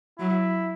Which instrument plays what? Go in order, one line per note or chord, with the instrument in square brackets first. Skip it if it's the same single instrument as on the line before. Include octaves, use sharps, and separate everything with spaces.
[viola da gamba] F#3 [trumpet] E4